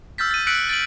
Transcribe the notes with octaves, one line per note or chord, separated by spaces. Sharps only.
E6 F6 G6 A6 B6
A6 D#7
E6 F#6 B6 C#7 D7 F#7
A6 D7 F#7